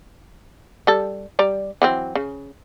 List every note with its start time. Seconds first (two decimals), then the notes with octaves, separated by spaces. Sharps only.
0.87 G3 A4
1.39 G3 D5 A#5
1.82 E3 F#3 C4
2.15 C#3